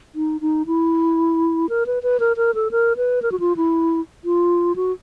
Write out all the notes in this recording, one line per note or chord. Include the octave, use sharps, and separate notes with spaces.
D#4
D#4
E4
A#4
B4
B4
A#4
A#4
A4
A#4
B4
A#4
F#4
F4
E4
F4
F#4